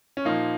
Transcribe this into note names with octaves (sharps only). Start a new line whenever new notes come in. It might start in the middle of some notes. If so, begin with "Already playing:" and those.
C#4
A#2 F3 A#3 D#4